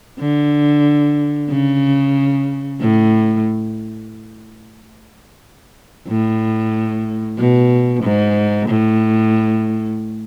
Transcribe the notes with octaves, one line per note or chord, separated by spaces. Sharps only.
D3
C#3
A2
A2
B2
G#2
A2